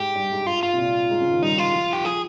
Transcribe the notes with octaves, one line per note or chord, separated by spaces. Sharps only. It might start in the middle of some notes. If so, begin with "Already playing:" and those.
Already playing: G#2 G4
G2
G#2
F4
F4
C3
A#2
G#2
C#3
D#3
G3 D#4
F4
F3
G4
F3 G#4